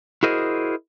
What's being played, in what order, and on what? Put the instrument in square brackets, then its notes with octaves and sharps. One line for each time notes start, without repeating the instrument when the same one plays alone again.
[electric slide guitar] E4 F#4 G#4 A#4 C5 D#5